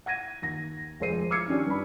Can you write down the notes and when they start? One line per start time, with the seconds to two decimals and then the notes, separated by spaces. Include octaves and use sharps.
0.06 F#5 G#6 A#6 D#7
0.42 D#2 A#6
1.00 F1 G#3 C5 C7 D#7
1.31 D6 E6 F6 G#6 C7 C#7
1.48 D#3 C#4 D4 G4 D5
1.66 G2 B5